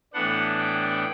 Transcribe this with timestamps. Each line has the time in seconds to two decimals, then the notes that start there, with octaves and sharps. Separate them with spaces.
0.13 A2 E3 B3 D4 F#5
0.59 G5